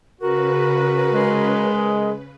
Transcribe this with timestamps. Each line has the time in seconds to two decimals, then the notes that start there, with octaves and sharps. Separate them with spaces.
0.21 C#3 F#4 A#4 B4
1.13 G#3